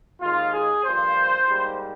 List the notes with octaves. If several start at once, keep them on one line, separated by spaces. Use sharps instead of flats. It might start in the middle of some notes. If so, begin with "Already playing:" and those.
D#2 D#3 G#3 F4
G#4
G2 F3 A#3 C5
G#2 G3 A#3